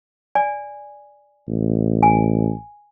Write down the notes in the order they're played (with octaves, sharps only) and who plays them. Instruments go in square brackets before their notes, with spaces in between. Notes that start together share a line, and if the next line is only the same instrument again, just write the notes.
[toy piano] D5 G#5
[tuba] A1
[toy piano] G#5